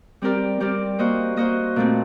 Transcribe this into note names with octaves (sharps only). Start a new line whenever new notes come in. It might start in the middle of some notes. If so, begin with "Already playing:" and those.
G3 C4 G4 A#4 D5
G3 C4 G4 A#4 D5
A#3 F#4 C5 D#5
A#3 F#4 C5 D#5
A#2 A3 C4